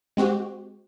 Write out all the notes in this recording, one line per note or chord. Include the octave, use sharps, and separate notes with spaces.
G#3 C4 F#4 G4